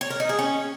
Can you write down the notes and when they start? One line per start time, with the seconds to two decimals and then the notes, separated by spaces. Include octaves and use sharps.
0.01 C#5
0.10 A#4
0.20 D#4
0.29 G#4
0.39 C#4